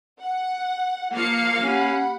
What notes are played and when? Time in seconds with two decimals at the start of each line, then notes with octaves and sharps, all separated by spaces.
0.20 F#5
1.14 F3 A#3 F5 C#7
1.63 C#4 G4 F#5 B5